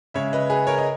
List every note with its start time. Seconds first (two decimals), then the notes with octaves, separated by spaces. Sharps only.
0.14 C#3 G#3 C#5 E5
0.33 B4 D#5
0.50 G#4 B4
0.67 A#4 C#5
0.78 D#5